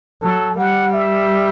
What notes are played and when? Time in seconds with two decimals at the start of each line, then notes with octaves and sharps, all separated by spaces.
0.21 F#3 A4
0.57 G3 F#5
0.94 E5